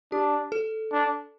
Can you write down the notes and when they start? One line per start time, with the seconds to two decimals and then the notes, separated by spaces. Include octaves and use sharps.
0.12 D4 G4
0.52 A4
0.92 D4